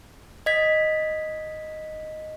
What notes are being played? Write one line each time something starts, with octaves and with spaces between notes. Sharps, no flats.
D#5 G#6 B6